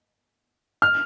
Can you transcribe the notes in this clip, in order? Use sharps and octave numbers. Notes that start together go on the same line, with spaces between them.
F6